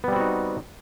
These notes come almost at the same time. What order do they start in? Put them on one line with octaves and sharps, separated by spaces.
B3 G3 C4 F#4 D#4